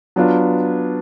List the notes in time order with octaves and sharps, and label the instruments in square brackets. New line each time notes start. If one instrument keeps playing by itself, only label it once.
[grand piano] F#3 B3 D4 F4